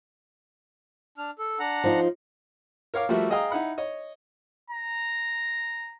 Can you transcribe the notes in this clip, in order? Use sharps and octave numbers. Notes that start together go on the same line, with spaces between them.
D4 F6
A4
D4 F#5 A#5
F3 D#4 F4
A#4 C#5 F5 D6 F6
F3 G3 A3 F#4 A#4 E5
G#4 D#5 F5 G5 A#5 D#6
D#4 E4 F#5 B5
C#5 D#5
A#5